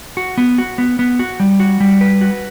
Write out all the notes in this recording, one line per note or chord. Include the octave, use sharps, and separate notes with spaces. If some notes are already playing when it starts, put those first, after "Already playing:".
F#4
B3
F#4
B3
B3
F#4
G3
F#4
G3
B4
F#4